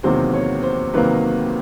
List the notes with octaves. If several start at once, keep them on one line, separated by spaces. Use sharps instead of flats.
E2 C3 D#3 F#3 A#3 C5
C#5
C5
C3 D#3 F#3 A#3 B4